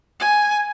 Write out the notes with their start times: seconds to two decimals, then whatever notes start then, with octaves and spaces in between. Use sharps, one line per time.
0.20 G#5